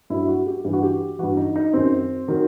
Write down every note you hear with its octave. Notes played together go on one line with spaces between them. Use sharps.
G2 F#3 E4
F#4
G4
G2 E3 G4
F#4
G4
G2 E3 F#4
D#4
D#4
F#2 D#3 F#3 C4
D#3 F#3